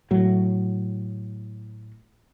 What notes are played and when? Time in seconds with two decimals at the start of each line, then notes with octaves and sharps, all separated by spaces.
0.11 A2 F#3